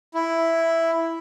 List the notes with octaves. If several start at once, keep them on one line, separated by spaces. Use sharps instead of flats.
E4